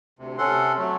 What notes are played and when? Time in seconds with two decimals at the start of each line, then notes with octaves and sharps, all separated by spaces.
0.19 D2 C3
0.38 C3 C#4 A4 F#5 C6
0.78 F#3 A3